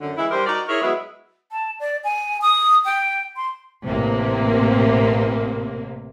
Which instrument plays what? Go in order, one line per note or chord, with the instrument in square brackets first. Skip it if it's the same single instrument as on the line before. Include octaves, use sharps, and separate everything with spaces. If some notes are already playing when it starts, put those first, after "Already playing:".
[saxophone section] F#2 D3
E3 G#3 E4
G3 D4 G4 A#4 C5
D#4 F#4 A#4 D5
E4 G#4 A#4 C#5
F#3 G#3 B3 E4
[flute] A5
D5
G#5
D#6
G5
C6
[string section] A1 C3 A#3